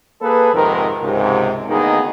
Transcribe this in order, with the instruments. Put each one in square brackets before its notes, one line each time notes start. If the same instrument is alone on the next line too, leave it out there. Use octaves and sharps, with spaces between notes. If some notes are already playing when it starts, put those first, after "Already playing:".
[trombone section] A#3 G#4 A4 B4
F2 G#2 C3 D#3 A#4
C#2 G#2 C3
D2 D#3 A#3 B3 D#4 G#4